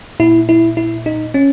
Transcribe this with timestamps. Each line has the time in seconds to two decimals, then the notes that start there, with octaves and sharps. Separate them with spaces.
0.20 A#2 E4
0.49 E4
0.77 E4
1.06 D#4
1.34 C#4